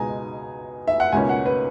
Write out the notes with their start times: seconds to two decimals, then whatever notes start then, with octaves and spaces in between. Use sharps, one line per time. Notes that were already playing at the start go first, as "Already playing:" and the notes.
Already playing: C#2 B2 G#3 G#5 A#5
0.87 E5
1.00 F#5
1.12 C#2 B2 A#3 C#4 G#5
1.29 F#5
1.46 B4